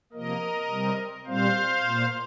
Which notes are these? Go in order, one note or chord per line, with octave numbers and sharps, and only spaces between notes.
C3 F3 A#3 A#4 D#5
C3 G3 C4
A#2 G3 C4 C5 F5
A#2 A#3